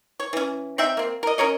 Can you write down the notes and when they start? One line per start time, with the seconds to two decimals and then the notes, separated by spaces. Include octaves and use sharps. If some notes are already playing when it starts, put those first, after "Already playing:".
0.20 C#5
0.33 E3 C#4
0.78 C4 D#4 E5 G5
0.97 A#3 C4
1.23 A#4 D#5
1.38 C#4 A#4 C#5 D#5